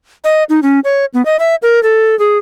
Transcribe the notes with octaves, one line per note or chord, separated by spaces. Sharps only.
D#5
D#4
C#4
C#5
B3
D#5
E5
A#4
A4
G#4